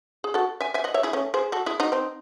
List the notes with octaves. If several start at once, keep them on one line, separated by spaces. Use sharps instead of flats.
G#4
F#4 A4
E5 G#5
E5 G#5
D#5 F#5
C#5 E5
E4 G#4
A3 C#4
G#4 C5
F#4 A4
E4 G#4
D#4 F#4
C4 D#4